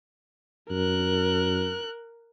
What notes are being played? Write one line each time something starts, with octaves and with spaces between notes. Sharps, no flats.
F#2 A#4 F#6